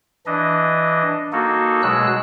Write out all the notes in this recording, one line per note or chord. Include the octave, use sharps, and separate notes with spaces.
E3 D4 D#5
A#3 D#4 F#4 A4
B2 F#3 G#3 E6 F#6